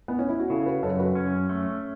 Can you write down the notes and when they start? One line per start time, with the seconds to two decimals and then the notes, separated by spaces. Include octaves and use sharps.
0.08 B3
0.19 C#4
0.29 E4
0.40 F#4
0.50 C#3 E4 A4
0.66 F#4 B4
0.83 F#2 A4 C#5
0.93 A4
0.99 F#4 B4
1.15 C#4
1.49 A3